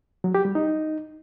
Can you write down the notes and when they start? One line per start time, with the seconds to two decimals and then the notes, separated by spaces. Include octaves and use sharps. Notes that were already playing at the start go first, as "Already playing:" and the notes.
0.24 F#3
0.35 G4
0.45 G3
0.55 D#4